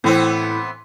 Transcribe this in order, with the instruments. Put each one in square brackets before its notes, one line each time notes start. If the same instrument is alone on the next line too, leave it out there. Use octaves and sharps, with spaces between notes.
[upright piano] A2 [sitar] E3 B3 C4